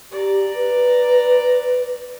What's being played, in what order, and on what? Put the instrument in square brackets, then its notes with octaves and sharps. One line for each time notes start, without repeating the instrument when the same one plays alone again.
[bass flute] G4 [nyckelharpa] D5 A#5
[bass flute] B4